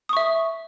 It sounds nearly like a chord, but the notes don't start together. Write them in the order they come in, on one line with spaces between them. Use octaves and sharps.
D#6 C#6 E5